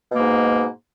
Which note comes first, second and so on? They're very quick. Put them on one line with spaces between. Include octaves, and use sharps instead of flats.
B2 A#3 G#2